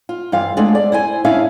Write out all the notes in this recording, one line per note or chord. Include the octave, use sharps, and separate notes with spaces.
F4
G2 E3 F4 F5
G#3 A3 B3 D4 G#4
D5
E4 C5 G#5
C#4 D4 E4 G#4 E5 F5